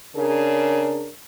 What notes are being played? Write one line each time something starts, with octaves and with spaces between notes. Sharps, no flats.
C#3 D4 G#4 A#4